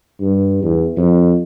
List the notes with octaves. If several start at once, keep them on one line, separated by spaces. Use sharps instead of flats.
G2
E2
F2